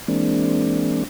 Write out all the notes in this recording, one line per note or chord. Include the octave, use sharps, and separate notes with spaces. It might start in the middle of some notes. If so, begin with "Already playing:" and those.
E3 G#3 A#3 C4 D4